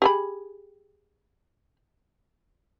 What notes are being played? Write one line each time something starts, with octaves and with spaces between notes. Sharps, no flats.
G4 G#4 B5